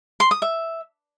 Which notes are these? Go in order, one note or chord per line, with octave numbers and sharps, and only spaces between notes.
C6
D#6
E5